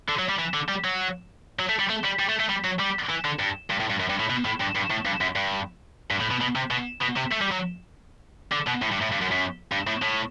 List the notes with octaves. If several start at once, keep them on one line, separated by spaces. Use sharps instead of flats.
D3
F#3
G3
E3
D3
G3
F#3
F#3
A3
G3
A3
G3
G3
A3
A3
G3
F#3
G3
E3
D3
G2
G2
A2
G2
F#2
G2
A2
B2
A2
G2
G2
A2
G2
F#2
G2
G2
A2
B2
B2
C3
B2
B2
C3
A3
G3
F#3
D3
B2
A2
G2
A2
G2
F#2
F#2
G2
A2
A2